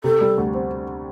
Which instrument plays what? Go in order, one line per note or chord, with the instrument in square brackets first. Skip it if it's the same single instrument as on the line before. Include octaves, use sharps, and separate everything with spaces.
[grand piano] C3 [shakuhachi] A4
[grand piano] G3
D2
C4